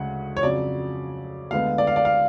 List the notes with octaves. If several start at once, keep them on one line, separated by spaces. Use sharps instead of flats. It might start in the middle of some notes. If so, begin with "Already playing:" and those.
Already playing: D2 C#3 G#3 F#5
C#5
F2 C#3 F#3 D5
D2 D3 G#3 B3 F5
D5
F5
D5
F5